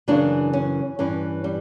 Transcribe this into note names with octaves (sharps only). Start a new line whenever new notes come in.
F#2 C#3 E3 D4
C#4
G2 E3 C#4
G3